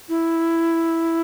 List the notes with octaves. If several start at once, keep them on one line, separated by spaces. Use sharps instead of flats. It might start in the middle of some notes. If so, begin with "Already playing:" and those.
E4